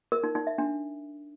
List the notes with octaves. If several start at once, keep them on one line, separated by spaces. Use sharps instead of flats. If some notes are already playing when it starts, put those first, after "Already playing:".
A#4
D#4
D#4
E5
D4